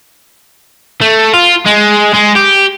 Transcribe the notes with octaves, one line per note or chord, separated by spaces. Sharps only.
A3
F4
G#3
G#3
G4